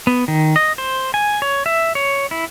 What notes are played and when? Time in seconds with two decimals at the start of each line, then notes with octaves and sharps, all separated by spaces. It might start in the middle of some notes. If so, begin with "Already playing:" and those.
0.07 B3
0.28 D#3
0.56 D#5
0.78 C5
1.14 G#5
1.42 C#5
1.66 E5
1.95 C#5
2.31 E4